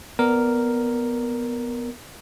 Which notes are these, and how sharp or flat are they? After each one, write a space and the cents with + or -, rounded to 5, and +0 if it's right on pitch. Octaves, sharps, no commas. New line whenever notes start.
B3 +0 A#4 +0 D5 +0